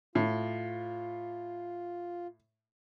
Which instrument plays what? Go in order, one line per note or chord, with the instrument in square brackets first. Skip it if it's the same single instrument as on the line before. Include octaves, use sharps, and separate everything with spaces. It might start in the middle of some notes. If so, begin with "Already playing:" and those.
[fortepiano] A2 [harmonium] F4